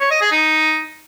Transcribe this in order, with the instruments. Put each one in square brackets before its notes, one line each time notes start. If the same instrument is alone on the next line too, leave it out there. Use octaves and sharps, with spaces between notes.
[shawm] C#5
D#5
G#4
D#4